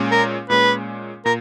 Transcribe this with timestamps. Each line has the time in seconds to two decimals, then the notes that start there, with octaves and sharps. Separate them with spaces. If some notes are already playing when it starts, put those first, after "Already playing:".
Already playing: A#2 G#3 C#4
0.12 A#4
0.50 A#2 G#3 C#4 B4
1.25 A#2 A#4